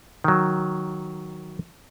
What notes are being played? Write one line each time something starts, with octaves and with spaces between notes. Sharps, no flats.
D#3 F#3